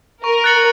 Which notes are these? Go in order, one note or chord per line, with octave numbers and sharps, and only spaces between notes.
A#4 C#6
F#6 A6 C#7 F#7